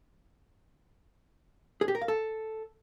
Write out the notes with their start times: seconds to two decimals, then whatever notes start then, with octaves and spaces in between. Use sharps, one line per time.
1.81 G#4
1.88 G4
1.95 A#4
2.02 F5
2.08 A4